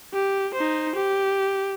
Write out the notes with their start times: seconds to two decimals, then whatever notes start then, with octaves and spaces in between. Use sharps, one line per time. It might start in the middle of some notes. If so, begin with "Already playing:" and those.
0.14 G4
0.55 D#4 C5
0.95 G4